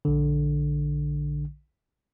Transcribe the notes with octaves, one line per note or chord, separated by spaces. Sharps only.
A#1 D3